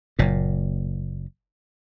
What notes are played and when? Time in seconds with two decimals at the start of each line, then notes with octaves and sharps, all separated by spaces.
0.19 F#1 A#2